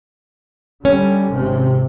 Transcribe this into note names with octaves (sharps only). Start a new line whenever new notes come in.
D3 G3 C#4
G#1 C3